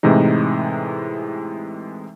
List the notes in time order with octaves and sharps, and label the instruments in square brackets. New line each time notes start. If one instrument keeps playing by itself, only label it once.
[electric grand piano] A2 C3 E3 G#3 D#4